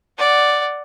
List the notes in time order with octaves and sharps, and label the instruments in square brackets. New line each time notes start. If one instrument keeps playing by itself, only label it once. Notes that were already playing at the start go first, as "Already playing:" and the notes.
[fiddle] D5 F#5